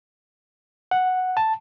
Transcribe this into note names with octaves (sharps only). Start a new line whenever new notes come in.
F#5
A5